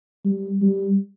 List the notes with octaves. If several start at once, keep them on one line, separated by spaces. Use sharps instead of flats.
G3
G3